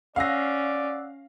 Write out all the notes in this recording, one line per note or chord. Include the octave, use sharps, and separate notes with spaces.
C#4 D5 F5 F#5 E6 F#6 A#6